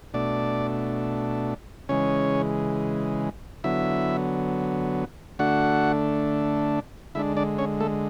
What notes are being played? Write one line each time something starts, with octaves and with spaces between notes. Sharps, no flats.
B2 A3 D4 D5
C#3 E3 G#3 C#4 C#5
D3 F#3 B3 E4 E5
D3 A3 D4 F#4 F#5
D3 G#3 D4 E4 E5
D4 D5
C#4 C#5
A3 A4